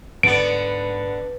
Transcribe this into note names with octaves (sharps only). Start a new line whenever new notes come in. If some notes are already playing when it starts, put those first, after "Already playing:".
G#2 D3 B3 B4 D7